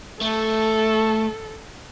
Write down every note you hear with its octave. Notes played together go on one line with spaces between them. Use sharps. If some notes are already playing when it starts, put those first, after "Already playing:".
A3 A4